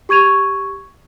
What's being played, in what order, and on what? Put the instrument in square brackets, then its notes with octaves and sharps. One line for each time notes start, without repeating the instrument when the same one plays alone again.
[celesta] G4 C#6 G#6 D#7 F7